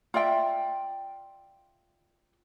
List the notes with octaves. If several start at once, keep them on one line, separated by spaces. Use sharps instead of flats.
F4 D5 E5 G5